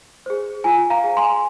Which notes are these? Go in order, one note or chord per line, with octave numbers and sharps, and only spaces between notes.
G#4 C5
F4 G#5
F5 A#5
G#4 C5
G#5 C6